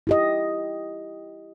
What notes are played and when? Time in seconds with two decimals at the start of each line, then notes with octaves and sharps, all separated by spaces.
0.07 E4 G4 D#5